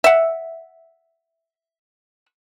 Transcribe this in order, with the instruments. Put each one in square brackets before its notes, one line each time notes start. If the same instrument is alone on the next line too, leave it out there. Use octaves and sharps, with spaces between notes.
[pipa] E5 F#5